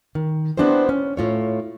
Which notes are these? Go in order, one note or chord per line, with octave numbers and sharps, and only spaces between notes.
D#3
B3 C4 D4 E4 G4 C5
C#4
A2 F4 C#5